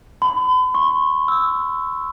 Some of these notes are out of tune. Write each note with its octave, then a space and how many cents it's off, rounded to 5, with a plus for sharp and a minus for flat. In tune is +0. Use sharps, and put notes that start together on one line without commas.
B5 +45
C#6 -30
E6 -5